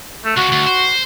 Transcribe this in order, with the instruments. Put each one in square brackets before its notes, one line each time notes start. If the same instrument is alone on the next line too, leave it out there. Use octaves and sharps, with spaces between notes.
[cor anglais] A3
[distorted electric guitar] C#2 C#3 [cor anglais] F#4
[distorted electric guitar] D2
C5